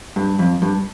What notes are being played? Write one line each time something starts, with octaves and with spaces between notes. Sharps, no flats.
G2
F2
G2